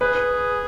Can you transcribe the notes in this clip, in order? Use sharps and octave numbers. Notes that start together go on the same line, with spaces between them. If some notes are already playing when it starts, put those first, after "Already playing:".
G#4 B4